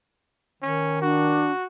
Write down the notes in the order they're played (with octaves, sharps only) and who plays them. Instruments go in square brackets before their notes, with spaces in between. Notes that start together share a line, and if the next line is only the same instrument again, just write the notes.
[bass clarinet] D#3 [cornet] C#4
[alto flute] D4 [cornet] F#4